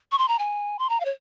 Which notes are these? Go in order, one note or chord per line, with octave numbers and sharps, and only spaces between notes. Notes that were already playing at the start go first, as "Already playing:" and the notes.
C#6
C6
A#5
G#5
C6
A#5
F5
C#5